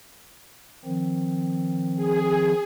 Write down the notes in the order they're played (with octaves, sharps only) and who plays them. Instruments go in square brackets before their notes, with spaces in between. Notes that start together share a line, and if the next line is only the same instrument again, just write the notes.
[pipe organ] D#3 F3 C4
[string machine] G#4